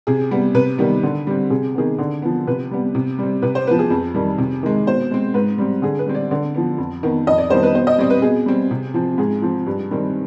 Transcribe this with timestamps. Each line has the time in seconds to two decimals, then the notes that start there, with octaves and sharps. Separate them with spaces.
0.07 C3 G#4
0.31 G3 B3
0.55 C3 B4
0.78 D#3 G3 B3
1.03 D3
1.27 G3 C4
1.50 C3 G#4
1.74 D#3 B3 G#4
1.98 D3
2.22 F3 B3
2.47 C3 B4
2.71 G3 B3
2.95 C3
3.19 G3 C4
3.42 C3 B4
3.55 C5
3.67 B3 B4
3.71 F3
3.79 G#4
3.90 F2
4.15 D#3 G3
4.38 C3
4.63 D#3 G#3
4.87 B2 C5
5.11 G#3 C4
5.34 G#2 B4
5.58 G3 C4
5.82 D3 G#4
5.99 B4
6.06 G3 C4
6.15 D5
6.31 D3 D5
6.54 F3 B3
6.78 F2
7.03 D#3 B3
7.27 F2 D#5
7.38 D5
7.50 D#3 G3 B3 C5
7.63 B4
7.75 B2 C5
7.87 D#5
7.98 G3 C4 D5
8.10 B4
8.22 B2 G#4
8.46 G3 C4
8.71 C3
8.94 F3 C4
9.18 G#2 G#4
9.42 F3 C4
9.67 G2
9.91 D#3 G3 C4